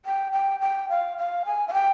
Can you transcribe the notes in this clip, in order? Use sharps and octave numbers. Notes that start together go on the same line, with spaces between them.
G5
G5
G5
F5
F5
G#5
F5
G5